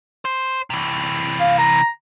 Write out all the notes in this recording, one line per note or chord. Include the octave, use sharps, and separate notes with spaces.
C5
C3 E3
F5
A#5